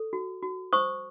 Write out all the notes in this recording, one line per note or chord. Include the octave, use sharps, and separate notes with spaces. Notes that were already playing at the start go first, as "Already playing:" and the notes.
Already playing: A4
F#4
F#4
C5 C#6 D#6